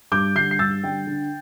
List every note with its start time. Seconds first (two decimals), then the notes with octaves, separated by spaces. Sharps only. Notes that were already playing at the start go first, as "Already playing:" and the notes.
0.12 G2 D6 G6
0.35 D3 G3 D4 G6 C7
0.51 C7
0.59 G2 E6 A6
0.84 D3 G3 D4 G5
1.07 D3